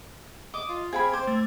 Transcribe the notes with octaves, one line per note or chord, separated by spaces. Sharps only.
D#5 D6
F4
C4 G#4 F5 B5 G#6
C5 D6
A3